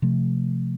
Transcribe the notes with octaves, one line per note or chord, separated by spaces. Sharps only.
C3 F3 A3